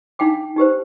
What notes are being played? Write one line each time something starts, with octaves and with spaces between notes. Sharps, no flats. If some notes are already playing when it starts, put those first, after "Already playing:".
D4 D#4 F5 G5 D6
D#4 G4 B4 C5